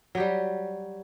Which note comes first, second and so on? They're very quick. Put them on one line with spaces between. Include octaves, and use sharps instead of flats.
F#3 G4 G3